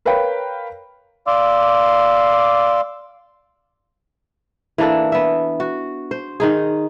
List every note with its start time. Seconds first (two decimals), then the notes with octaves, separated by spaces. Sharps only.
0.05 A#4 B4 C#5 F5 G5 B5
1.27 D5 F5 C6 D6 E6
4.78 E3 A#3 D4 A4
5.12 B3 E5
5.60 F#4
6.11 C5
6.40 D#3 D#4 G#4